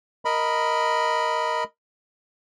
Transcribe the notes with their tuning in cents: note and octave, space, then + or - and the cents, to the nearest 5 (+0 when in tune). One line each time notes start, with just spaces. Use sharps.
A#4 +0 D#5 +0 B5 +0